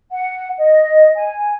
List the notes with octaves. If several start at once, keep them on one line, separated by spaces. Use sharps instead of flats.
F#5
D#5
G#5